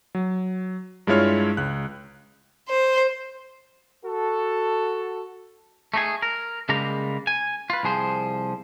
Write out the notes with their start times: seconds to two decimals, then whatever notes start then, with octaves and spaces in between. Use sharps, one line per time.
0.15 F#3
1.07 G2 G#3 E4 F4 C#5 F6
1.57 C#2 F#6
2.67 C5
4.05 F#4 A4
5.94 A3 D#4 G#4
6.22 A#4
6.69 C#3 G3 G#3 A#3 A#5
7.27 G#5
7.70 F4 B4
7.83 C2 F3 G#4 C5